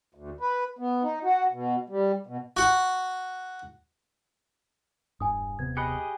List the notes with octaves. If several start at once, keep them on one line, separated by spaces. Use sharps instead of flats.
D2
B4
B3
D#4
F#4
B2
G3
B2
F#4 F#5
E1 G2 G#5 D#6
D#1 C3 B3 G#6
G4 G#4 D#5 B5 F#6 C#7